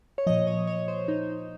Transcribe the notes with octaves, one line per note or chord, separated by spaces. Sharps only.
C#5
A#2 F3 D#5
C#5
C#5
C5
D#4